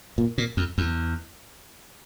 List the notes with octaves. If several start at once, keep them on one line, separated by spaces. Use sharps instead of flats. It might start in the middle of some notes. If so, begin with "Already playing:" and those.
A#2
A#2
F2
E2